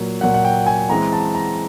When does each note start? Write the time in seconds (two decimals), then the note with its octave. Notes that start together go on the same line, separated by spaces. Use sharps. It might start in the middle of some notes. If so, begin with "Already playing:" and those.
Already playing: A#2 F#3 A#3
0.21 A#2 F#3 A#3 F#5
0.34 F#5
0.44 G5
0.66 G#5
0.90 E3 G#3 C4 A#5
1.13 A5
1.35 A#5